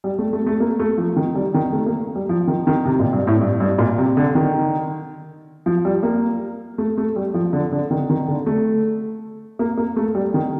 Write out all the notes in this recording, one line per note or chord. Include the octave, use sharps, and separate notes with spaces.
G3
A3
A3
A3
A#3
A3
F3
D#3
G3
D#3
A3
A#3
G3
F3
D#3
D#3
C3
A#2
G2
A2
G2
G2
A#2
C3
D3
D#3
F3
G3
A#3
A3
A3
G3
F3
D3
D3
D#3
D#3
D3
A3
A#3
A#3
A3
G3
D#3